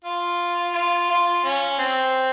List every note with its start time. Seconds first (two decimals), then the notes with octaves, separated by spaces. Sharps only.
0.05 F4
0.74 F4
1.10 F4
1.44 C#4
1.79 C4